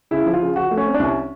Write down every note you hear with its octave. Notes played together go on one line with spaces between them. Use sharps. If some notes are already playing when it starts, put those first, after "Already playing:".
C#3 E4
F3
F4
C#3
F3 F#4
A3
C#4
C4
D4
C2 C#4